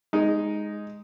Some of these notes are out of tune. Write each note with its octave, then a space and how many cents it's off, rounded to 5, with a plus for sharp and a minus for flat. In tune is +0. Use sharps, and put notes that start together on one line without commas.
G#3 +0 D#4 +0